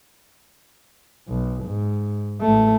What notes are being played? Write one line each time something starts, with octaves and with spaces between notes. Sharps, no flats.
B1
G#2
A1 A3